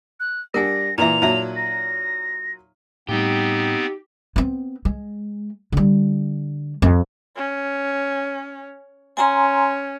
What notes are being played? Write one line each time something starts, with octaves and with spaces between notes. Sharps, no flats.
F#6
G3 D4 A#4 F#5 G#5 A#6
A#2 E3 E5 A#5 F7
A#2 F#3 D#4 E5
A#6
A2 G3 B3 C4 D#4 G4
B3 C4
G#3
D3 G3
F2
C#4
C#4 G#5 A#5 C6